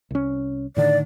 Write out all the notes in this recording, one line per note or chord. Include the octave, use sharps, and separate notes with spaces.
C2 C#4
A2 D3 D#3 D5